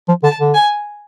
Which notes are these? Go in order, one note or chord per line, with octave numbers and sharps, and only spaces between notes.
F3
D3 A5
D3
G#5